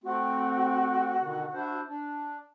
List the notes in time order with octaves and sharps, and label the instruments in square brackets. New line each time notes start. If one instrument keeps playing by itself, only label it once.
[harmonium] A3 C4 [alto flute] F#4
[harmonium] B2 D3 D#3
D4 E4 C5
D4